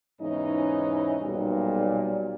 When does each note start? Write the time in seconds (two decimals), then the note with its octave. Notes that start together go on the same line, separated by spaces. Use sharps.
0.20 E2 G#2 C#3 E3 C#4 D#4
1.22 B1 A#2 G3